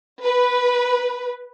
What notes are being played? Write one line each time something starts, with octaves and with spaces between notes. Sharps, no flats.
B4